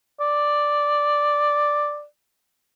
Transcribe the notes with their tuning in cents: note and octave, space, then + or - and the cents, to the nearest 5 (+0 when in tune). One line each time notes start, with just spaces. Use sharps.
D5 +0